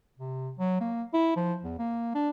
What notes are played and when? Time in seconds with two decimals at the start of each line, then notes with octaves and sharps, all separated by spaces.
0.19 C3
0.59 F#3
0.81 A#3
1.14 E4
1.36 F3
1.64 E2
1.79 A#3
2.15 D4